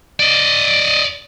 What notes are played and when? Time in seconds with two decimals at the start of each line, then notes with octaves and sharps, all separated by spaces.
0.20 D5 D#5